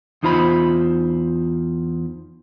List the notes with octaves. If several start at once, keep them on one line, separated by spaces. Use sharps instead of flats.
E2 D#4 F4 C5 B5